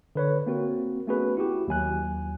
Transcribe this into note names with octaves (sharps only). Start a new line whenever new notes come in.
D3 B4 C#5
A#3 C4 F#4 A#4
A3 B3 C#4 F#4 G#4 B4
E4 F#4 G4
D#2 F#3 G#5 F#6